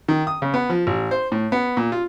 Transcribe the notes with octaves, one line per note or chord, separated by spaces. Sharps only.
D#3
D#6
C#3
B3
F3
A1
C5
A2
B3
A#2
F4